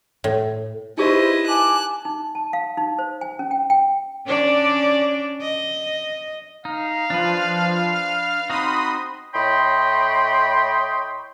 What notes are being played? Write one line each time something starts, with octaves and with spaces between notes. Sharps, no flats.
A2
D#4 E4 G4 B4 C5 D5 D#5
G#5 A5 D6 F#6
D#4
A5
F5
D#4
C5
G#5
C#4
G5
G5
C#4 D4 D5
D#5
D#4 F5
F3 D4 B4
F6
C4 D#4 F#4 B5 C6 D#6
A2 C#5 D#5 G5 B5 C6